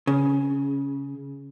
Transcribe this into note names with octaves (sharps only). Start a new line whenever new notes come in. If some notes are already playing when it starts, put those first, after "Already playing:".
C#3